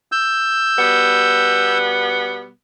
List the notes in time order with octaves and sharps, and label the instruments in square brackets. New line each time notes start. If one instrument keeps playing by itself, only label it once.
[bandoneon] E6 G6
[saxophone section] B2 G3 B3